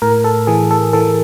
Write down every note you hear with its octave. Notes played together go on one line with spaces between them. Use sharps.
A2 A#4
A4
E3 G#4
A4
E3 A4